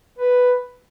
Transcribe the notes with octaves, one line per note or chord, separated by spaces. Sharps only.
B4